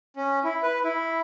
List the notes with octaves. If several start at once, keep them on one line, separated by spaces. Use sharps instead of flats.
C#4
E4
B4
E4